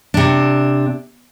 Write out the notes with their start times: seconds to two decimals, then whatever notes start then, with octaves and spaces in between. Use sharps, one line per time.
0.14 C3 D4